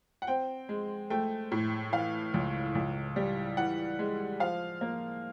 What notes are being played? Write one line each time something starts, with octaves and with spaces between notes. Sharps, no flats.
F#5
C4 G5
G#3
A3 G5
A2
E3 F5
C#2
C#2
G3
E3 F#5
G#3
F3 F5
A#3